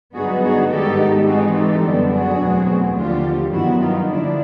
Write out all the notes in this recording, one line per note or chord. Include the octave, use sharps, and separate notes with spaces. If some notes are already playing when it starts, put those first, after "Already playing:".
G2 D3 F#3 B3 D#4 F#4 G#4
F#4 G#4
G#2 D#3 G3 B3 D#4 G4 A4
G#2 E3 G#3 C4 D#4 F#4 G#4
G4 A4
F#2 D3 G3 B3 D4
F#4 G#4
E2 B2 F#3 A3 C4
D#2 D3 F3 F4 G4
G2 D#3 F#3 B3 E4 F#4
D#4 F4
D3 F3 A#3 D4 E4